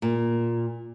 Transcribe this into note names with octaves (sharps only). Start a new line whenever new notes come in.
A#2